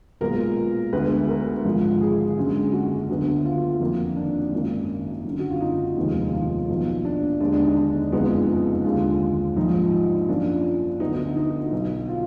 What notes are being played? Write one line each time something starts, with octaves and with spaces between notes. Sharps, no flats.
B1 A#2 G#3 B3 A#4
D2 D3 G#3 B3 B4
A#4
G#1 G#2 F3
G#4
F#1 F#2 D3 G#3
F#4
D2 D3 F#3 B3
F4
F2 D#3 A#3
D4
G#1 F#2 D#3 A#3
F#1 F#2 D3
F#4
F4
D#4
F1 D#2 D#3 G#3 B3
F4
D#4
B1 A#2 F3 B3
D4
D#2 D3 G#3 B3 D4
D4
D#4
D4
F#1 F2 F3 G#3 B3 D#4
D#2 D3 G#3 F4
A#1 G#2 F3 D#4
F#2 F3 A#3 D4
D2 D3 F#3 B3 D#4
D#4
B1 B2 F#3 B3
F4